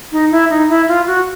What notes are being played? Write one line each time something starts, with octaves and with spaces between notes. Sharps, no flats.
D#4
E4
D#4
E4
F4
F#4